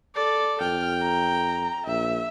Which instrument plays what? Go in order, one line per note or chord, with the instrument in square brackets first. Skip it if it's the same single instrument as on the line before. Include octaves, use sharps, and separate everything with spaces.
[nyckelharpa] A4 D5
[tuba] F2 [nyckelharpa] G5 [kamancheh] F6
[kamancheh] A#5
[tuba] A#1 [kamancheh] E5